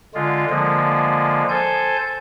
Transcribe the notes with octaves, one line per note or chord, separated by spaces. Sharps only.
D3 G#3 F4
D3 F3 G#3 A#3
A4 C5 G#5 G6